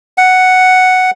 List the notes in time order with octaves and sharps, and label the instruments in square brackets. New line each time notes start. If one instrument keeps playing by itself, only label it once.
[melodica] F#5